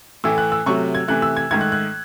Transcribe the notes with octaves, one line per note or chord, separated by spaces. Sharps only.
A2 E3 A3 E6
F#6
E6
C3 F#3 A3 C#6
G#6
C3 E3 A3 F#6
E6
G#6
G#2 D#3 A3 G#6
F#6
F#6